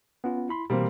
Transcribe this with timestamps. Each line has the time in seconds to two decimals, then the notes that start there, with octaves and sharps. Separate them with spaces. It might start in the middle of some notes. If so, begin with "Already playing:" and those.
0.24 B3 C#4 F4
0.49 E4 B5 C6
0.70 B2 E3 G3 A#3 C4